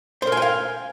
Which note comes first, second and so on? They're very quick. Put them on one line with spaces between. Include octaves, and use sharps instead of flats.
C5 A#4 G#5 G5 F5